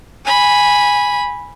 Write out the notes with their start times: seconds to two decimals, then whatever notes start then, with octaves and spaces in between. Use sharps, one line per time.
0.25 G#5 B5